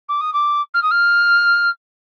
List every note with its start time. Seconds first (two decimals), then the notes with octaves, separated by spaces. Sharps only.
0.08 D6
0.21 D#6
0.33 D6
0.74 F6
0.82 D#6
0.91 F6